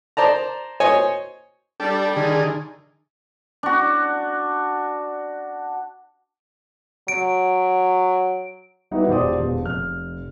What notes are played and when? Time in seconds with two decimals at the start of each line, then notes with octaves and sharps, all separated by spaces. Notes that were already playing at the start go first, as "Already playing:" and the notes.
0.17 C5 D5 A5 A#5
0.80 C5 C#5 D#5 G#5
1.80 G3 D4 G4 A4
2.16 D3 D#3 G#4
3.63 D4 F#4
7.08 F#3 D7
8.91 G3 B3 D#4 E4 F#4 G4
9.08 E1 F4 G4 C5 D5 D#6
9.40 E1
9.63 F1 F6